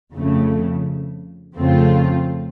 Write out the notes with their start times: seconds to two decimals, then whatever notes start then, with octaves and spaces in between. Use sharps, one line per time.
0.11 F2 C#3 A3
1.54 F2 C#3 A3 C4 F4